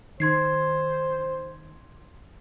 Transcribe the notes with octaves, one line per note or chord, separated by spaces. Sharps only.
D#3 C5 C6 G#6 C7